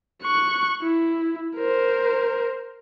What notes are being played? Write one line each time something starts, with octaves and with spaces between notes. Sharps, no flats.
C#6 F#6
E4
A#4 C5